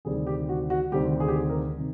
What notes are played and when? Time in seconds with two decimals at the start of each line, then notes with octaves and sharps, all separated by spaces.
0.05 D2 C3 D#3 G3 C4 G#4
0.27 G4
0.49 F#4
0.70 F#4
0.92 D2 C3 D#3 G3 C4 G4
1.20 G#4
1.28 G4
1.35 G#4
1.49 A#4
1.78 C3 D#3